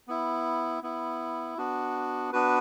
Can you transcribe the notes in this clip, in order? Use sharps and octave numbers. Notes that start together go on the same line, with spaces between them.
B3 E4
B3 E4
B3 D4 F#4
B3 D4 F#4 B4